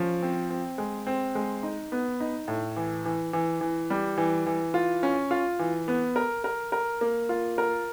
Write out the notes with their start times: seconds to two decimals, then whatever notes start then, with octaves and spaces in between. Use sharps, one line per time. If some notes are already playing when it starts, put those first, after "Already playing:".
Already playing: F3 C#4
0.23 C4
0.50 C4
0.78 G#3
1.07 C4
1.35 G#3
1.63 D#4
1.92 B3
2.20 D#4
2.48 A2
2.76 E3
3.05 E3
3.33 E3
3.61 E3
3.90 G3
4.18 E3
4.46 E3
4.74 F4
5.03 C#4
5.31 F4
5.59 E3
5.88 B3
6.16 A#4
6.44 A#4
6.72 A#4
7.01 A#3
7.29 F4
7.58 A#4